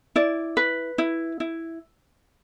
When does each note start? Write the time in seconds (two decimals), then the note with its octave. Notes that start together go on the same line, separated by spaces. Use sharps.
0.16 E4 D5
0.57 B4
0.98 E4
1.40 E4